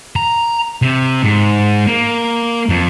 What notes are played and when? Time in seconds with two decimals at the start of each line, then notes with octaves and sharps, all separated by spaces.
0.16 A#5
0.82 C3
1.23 G#2
1.87 A#3
2.69 F2